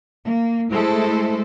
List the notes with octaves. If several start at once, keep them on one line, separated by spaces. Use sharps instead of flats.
A#3
G#3 A3 E4 A4 C5